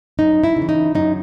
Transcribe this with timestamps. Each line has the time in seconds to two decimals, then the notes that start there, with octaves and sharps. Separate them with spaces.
0.19 F#2 D#4
0.44 E4
0.56 C#3
0.62 E3
0.69 D#4
0.95 F#2 D#4